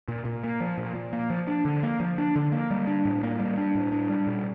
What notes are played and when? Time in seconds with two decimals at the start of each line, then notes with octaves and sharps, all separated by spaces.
0.08 A#2
0.25 A#2
0.43 A#3
0.60 F3
0.78 A#2
0.95 A#2
1.13 A#3
1.30 F3
1.47 D4
1.65 D3
1.83 A#3
2.00 F3
2.18 D4
2.36 D3
2.52 A#3
2.71 G3
2.87 D4
3.05 A2
3.23 A#3
3.40 G3
3.58 D4
3.75 A2
3.92 D4
4.09 G3
4.27 A#2